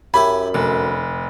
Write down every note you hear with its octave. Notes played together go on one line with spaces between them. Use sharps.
F#2 E4 G4 G#5 B5
F1 D3